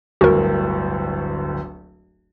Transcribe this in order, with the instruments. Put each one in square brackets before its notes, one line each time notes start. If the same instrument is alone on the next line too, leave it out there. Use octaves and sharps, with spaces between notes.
[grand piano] D1 G1 D2 [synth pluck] F#4 A#4